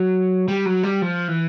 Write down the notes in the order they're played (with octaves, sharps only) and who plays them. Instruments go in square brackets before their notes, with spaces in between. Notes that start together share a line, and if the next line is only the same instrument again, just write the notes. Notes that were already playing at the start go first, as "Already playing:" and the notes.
Already playing: [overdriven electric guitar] F#3
G3
F#3
G3
F3
E3